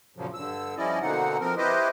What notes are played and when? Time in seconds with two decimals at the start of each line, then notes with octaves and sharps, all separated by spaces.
0.17 F#2 A#2 C#3 F3 F#3
0.34 G2 D3 E6
0.77 F3 G3 C#4 E4 D5 D#5
1.01 B2 D3 A#3 C4 D#4 F#5
1.40 F3 C4 A#4
1.57 E4 G4 B4 C5 D#5